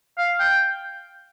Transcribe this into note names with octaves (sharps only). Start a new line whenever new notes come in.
F5
G5